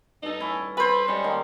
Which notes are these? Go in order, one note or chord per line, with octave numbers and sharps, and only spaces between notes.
G2 D#4 A4
C#4 E4
B4 C5 B5
G3 G#3 C#4
D#3 A#3